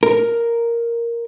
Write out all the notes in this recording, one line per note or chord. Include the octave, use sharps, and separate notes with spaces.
A#4